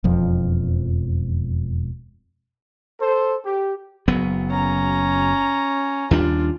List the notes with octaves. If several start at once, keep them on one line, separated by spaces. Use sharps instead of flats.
E1 F2 F3
A4 C5
G4
F#1 F#3 B3
C#4 A#5
D#2 G3 D4 F4